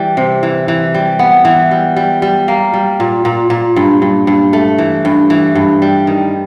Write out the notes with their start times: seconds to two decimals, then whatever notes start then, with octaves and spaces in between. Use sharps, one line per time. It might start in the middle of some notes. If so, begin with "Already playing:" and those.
Already playing: E3 G3
0.17 C3
0.43 E3
0.68 E3
0.94 G3
1.19 B3
1.45 E3
1.71 G3
1.96 G3
2.22 G3
2.48 A#3
2.73 G3
3.00 A#2
3.25 A#2
3.50 A#2
3.76 G2
4.02 G2
4.27 G2
4.53 A3
4.78 E3
5.05 G2
5.30 E3
5.55 G2
5.82 G3
6.07 D#3